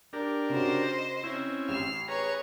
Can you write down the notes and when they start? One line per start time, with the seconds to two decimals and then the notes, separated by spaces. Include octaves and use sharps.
0.13 D4 G4 A#4
0.50 C#3 F#4 C5 D#5
1.23 C4 C#4 E4
1.69 A1 F6 C7 E7
2.08 G#4 B4 C#5 A#5